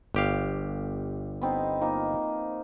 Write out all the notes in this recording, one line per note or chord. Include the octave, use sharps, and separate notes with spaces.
G1 G4 F5
B3 C4 D#4
F3 A#3 D#4